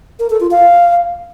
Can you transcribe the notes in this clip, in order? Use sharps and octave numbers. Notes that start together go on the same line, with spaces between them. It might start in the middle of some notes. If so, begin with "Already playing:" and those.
A#4
A4
F4
F5